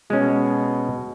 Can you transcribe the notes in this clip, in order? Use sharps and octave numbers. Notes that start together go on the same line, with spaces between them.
B2 G#3 C#4